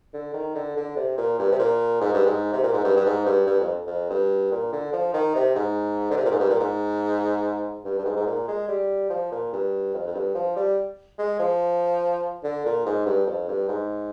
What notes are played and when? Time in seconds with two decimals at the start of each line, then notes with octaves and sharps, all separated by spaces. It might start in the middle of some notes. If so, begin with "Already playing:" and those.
0.14 D3
0.34 D#3
0.55 D3
0.77 D3
0.96 C3
1.18 A#2
1.39 G2
1.52 C3
1.59 A#2
2.01 G#2
2.14 G2
2.26 G#2
2.53 C3
2.63 A#2
2.73 G#2
2.84 G2
2.97 G2
3.06 G#2
3.26 G2
3.47 G2
3.60 F2
3.87 F2
4.10 G2
4.52 A#2
4.73 D3
4.93 F3
5.14 D#3
5.35 C3
5.55 G#2
6.11 D3
6.17 C3
6.25 A#2
6.32 G#2
6.39 G2
6.50 A#2
6.60 G#2
7.85 G2
7.99 G2
8.05 G#2
8.17 G#2
8.26 A#2
8.48 G#3
8.68 G3
9.10 F3
9.31 A#2
9.53 G2
9.94 F2
10.07 F2
10.15 G2
10.35 F3
10.56 G3
11.19 G#3
11.39 F3
12.44 D3
12.65 A#2
12.86 G#2
13.06 G2
13.27 F2
13.48 G2
13.68 G#2